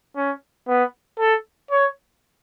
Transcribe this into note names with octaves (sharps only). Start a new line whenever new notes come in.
C#4
B3
A4
C#5